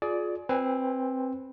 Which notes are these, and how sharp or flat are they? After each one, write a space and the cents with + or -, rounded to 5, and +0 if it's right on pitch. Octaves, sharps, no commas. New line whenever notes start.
F4 +25 G#4 +25 D5 +0
C4 +5 B4 +0 G#5 -20